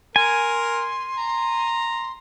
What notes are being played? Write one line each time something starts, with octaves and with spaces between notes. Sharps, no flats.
A#4 G#5 C6
A#5